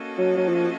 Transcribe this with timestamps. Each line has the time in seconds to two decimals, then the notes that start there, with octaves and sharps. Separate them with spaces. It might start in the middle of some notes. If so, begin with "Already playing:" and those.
Already playing: A#3 C#4 F#4 A4 D#5
0.18 F#3
0.37 F#3
0.48 F3